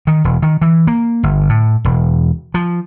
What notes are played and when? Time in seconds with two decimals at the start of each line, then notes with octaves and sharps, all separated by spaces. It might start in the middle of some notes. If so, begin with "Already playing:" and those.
0.07 D#3
0.24 E1
0.42 D#3
0.62 E3
0.87 A#3
1.23 G1
1.49 A2
1.85 E1
2.54 F3